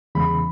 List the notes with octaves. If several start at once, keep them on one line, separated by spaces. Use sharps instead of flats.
E2 C#3 E3 G#3 B5